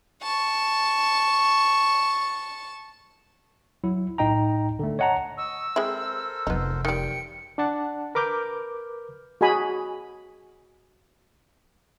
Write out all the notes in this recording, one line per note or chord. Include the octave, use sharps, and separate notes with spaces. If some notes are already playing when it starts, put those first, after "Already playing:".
A5 C#6
F#3 E4
B1 A2 D#4 D#5 G5 A#5
D3 A3
C#5 D#5 F#5 A5 A#5
D#5 C#6 E6
G#3 C4 E4 A4 A#4 C5
F1 F3 B3 D#4
D#3 G3 G5 C#7
D4 F#5 A5
A#4 B4 D6 F6 G6
F#4 G#4 D#5 G#5 B5